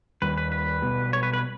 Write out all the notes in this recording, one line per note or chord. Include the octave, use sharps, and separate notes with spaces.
D#2 D#3 G3 B4
B4
B4
B1 B2 G3 B3
C#5
B4
B4